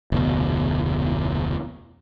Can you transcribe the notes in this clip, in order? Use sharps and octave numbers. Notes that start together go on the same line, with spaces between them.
F1 D2 B2